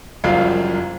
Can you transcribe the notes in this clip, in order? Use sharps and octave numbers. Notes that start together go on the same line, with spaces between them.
F#1 C2 F#2 F3 F5